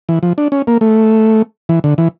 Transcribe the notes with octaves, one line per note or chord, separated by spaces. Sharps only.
E3
F3
D4
C#4
A#3
A3
E3
D3
E3